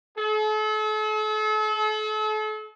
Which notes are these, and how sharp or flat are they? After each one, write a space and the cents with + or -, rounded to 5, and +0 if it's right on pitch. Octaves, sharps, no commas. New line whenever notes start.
A4 -40